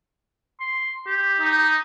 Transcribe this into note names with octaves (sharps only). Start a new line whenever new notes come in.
C6
G4
D#4